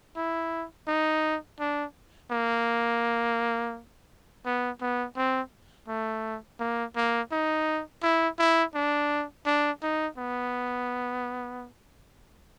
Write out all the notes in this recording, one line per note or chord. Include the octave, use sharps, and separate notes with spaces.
E4
D#4
D4
A#3
B3
B3
C4
A3
A#3
A#3
D#4
E4
E4
D4
D4
D#4
B3